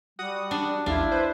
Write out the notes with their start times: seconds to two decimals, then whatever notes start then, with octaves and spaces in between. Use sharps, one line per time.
0.19 G3 F#4 F#5 D#6
0.51 D4
0.86 A1 D#2 D4 E4 F4
1.11 B4 C5